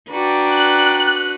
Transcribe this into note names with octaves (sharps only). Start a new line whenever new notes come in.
D4 F#4 B4 D5 G5 A#5
F#6